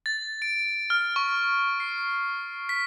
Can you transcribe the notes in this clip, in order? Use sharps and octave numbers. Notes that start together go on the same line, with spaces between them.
A6
D7
F6
C#6
C7
B6